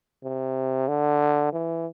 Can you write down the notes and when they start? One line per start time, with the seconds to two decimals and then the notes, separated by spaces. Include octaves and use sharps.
0.24 C3
0.88 D3
1.53 E3